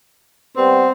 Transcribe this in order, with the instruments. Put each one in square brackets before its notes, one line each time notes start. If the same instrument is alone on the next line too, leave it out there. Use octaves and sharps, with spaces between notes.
[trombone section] G3 B3 [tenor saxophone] C4